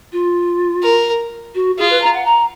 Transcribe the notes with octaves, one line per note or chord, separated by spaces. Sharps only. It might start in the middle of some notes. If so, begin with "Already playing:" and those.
F4
A#4
F#4
F4 G#4
B4
A#5
F#5
A#5